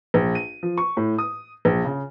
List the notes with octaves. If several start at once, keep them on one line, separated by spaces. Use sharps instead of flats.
A#1
D#7
F3
C#6
A2
D#6
A#1
C#3